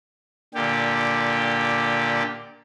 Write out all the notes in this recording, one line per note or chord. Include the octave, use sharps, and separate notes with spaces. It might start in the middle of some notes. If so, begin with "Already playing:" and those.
A#2 D3 G4